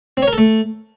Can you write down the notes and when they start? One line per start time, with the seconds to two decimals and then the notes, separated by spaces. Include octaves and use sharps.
0.17 C4
0.22 C#5
0.28 A#4
0.33 A4
0.38 A3